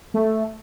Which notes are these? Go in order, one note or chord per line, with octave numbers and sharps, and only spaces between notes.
A3